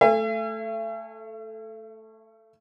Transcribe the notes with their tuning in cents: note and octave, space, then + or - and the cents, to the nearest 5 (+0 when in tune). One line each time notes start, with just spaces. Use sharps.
A3 +0 E5 +40 G#5 -30